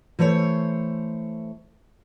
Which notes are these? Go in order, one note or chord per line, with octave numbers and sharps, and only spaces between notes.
E3 A3 C5 C#5